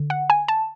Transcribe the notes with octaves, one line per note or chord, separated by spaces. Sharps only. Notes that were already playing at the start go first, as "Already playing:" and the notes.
Already playing: D3
F#5
G#5
A5